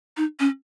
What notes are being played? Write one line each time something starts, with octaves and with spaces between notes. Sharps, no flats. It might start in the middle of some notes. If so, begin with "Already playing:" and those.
D#4
C#4